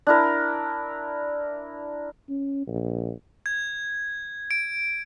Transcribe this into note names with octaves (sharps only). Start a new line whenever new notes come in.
D4 E4 A#4
C#4
A#1
G#6
D7